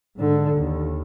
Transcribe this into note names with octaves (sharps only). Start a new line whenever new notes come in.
G#2 D3
D#2